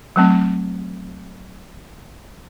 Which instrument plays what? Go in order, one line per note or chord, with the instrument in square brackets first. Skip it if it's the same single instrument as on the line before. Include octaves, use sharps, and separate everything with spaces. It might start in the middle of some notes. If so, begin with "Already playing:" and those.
[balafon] F#3 A3 C4